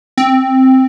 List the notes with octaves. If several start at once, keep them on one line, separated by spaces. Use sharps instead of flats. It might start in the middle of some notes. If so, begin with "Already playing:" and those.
C4